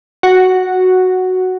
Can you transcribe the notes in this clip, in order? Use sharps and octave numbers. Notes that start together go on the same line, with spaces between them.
F#4